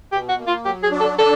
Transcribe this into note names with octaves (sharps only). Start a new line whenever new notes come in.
B2 G4
F#4
A#3
F4
F#3 G4
G#4
D4
A4
D4 A4